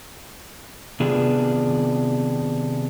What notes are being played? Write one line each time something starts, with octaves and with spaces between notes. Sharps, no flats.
C3 D#3 B3 D4 F4 G#4